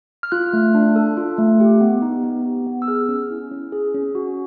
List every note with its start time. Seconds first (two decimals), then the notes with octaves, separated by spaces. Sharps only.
0.23 F6
0.32 F4 F#6
0.53 A3
0.75 D4
0.96 A4
1.17 F4
1.38 A3
1.60 G4
1.81 B3
2.02 D#4
2.24 B3
2.45 G4
2.67 B3
2.82 E6
2.88 G#4 F6
3.09 C#4
3.30 E4
3.51 C#4
3.72 G#4
3.94 C#4
4.15 F#4